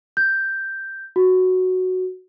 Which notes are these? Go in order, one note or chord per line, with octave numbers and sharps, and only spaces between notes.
G6
F#4